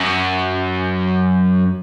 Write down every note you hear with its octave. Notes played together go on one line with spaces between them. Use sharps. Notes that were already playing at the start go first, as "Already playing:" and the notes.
Already playing: F#2